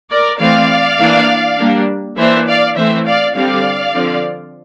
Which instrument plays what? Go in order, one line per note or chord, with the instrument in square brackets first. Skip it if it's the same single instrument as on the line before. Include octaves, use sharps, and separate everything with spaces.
[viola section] A#4 D5
E3 A3 C4 D5 F5
E3 A#3 D4
G3 A#3 D4
E3 A#3 D4 C5 E5
D5 F5
E3 A3 C4 C5 E5
D5 F5
D3 G3 C4 D5 F5
D3 F3 C4